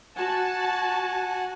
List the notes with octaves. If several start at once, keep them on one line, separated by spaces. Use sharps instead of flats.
F#4 F#5 G#5 A5